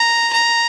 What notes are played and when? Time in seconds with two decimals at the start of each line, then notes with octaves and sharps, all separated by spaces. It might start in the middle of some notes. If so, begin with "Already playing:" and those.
Already playing: A#5
0.32 A#5